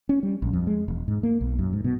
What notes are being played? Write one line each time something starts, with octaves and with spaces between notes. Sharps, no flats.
C#4
G3
A#1
F2
G#3
E1
G#2
A#3
B1
F#2
G#2
B2